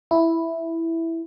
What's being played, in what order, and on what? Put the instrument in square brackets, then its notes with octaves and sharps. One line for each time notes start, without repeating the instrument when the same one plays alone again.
[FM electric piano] E4